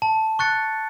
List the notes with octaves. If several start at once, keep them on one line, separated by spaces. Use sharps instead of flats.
A5
C#6 F#6 A6 C#7